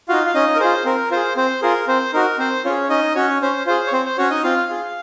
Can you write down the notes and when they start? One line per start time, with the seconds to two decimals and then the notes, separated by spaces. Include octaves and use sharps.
0.09 D#4 F4 F#4 F5
0.26 F5
0.34 C#4 D#4 D#5
0.56 A#4
0.60 F4 G#4 C5
0.85 C4 A#4
1.11 F4 G#4 C5
1.37 C4 C5
1.62 F4 G#4 A#4
1.88 C4 C5
2.14 D#4 F#4 A#4
2.39 C4 C5
2.65 C#4 F4 G#4 C#5
2.90 C#4 D#4 D#5
3.15 C#4 F#4 C#5
3.42 C#4 C5
3.66 F4 G#4 C5
3.87 C#5
3.93 C4 C5
4.06 C5
4.18 C#4 F#4 C#5
4.30 D#4 D#5
4.43 C4 F4 F5
4.69 F4 G#4